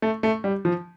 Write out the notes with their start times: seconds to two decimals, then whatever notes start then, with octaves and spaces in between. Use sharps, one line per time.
0.02 A3
0.23 A3
0.44 G3
0.65 F3